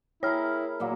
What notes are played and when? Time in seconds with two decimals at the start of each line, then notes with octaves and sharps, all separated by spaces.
0.23 E4 G#4 A#4 C#5 F6
0.80 A#2 F#3 A#3